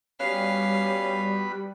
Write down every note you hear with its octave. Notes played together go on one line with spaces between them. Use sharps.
G3 B3 C#4 F#4 B4 F5